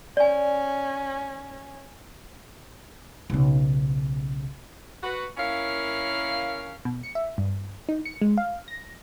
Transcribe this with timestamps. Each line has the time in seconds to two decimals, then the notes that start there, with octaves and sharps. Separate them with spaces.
0.17 C#4 D5 G#5
3.30 B1 C#3
5.03 F#4 B4
5.37 A#3 C#4 E4 A#4 C#5 F5
6.85 B2
7.03 C#7
7.15 E5
7.38 G2
7.89 D#4
8.05 C#7
8.21 G#3
8.38 F5
8.68 A#6